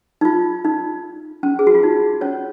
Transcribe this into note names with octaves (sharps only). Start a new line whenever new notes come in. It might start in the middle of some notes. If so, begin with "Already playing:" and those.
D#4
F4
D#4
C#4
G#4
F#4
F4
D#4
C#4 C#5